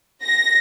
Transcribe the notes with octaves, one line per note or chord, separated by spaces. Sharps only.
A#6